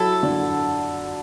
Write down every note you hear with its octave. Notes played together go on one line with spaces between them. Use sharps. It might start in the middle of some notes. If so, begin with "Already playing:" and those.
Already playing: F#3 E4 A4
D3